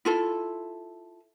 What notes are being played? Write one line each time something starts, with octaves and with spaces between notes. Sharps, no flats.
E4 F4 A4